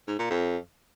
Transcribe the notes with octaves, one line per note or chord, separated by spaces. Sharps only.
G#2
A#2
F2